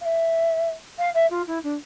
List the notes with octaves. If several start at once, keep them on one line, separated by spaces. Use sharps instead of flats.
F5
E5
F5
E5
F4
E4
D4